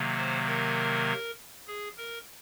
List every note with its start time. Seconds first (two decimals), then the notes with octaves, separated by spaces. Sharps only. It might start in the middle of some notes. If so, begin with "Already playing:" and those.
Already playing: C3 D#3 F#3 A#3
0.17 C5
0.47 A#4
1.68 G#4
1.97 A#4